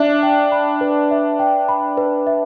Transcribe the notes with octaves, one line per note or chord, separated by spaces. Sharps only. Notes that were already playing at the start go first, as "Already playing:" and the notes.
Already playing: D4 E5
G5
B5
B4
E5
G5
B5
B4
E5